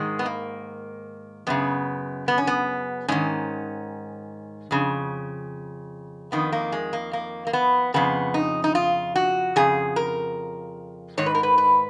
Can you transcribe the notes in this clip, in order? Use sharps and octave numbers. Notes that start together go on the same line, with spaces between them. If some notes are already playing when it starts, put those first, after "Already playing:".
Already playing: G#2 D#3 G#3
B3
A#3
F#2 C#3 B3
B3
C#4
B3
G#2 D#3 C#4
F2 C#3
F2 D#3 B3
A#3
G#3
A#3
A#3
A#3
B3
F2 C#3 B3
D#4
D#4
F4
F#4
F2 C#3 G#4
A#4
G#2 D#3 C#5
B4
A#4
B4
B4